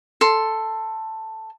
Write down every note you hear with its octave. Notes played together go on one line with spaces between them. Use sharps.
A4 C6